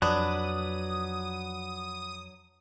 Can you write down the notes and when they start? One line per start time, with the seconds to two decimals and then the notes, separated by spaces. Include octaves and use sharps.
0.02 F2 F3 F#3 D4 B4 D#6